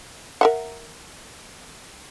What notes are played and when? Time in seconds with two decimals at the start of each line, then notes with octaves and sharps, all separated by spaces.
0.41 A#4 E5 F#5